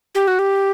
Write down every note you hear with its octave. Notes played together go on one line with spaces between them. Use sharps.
G4
F#4
G4